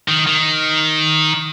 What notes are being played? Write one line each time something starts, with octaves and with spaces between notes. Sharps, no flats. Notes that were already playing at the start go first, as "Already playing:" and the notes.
D#3
D#3